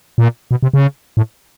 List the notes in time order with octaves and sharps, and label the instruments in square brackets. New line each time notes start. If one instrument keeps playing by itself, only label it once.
[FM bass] A#2
B2
C3
C#3
A2